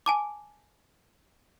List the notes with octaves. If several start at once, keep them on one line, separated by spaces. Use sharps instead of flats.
G#5 A5 D6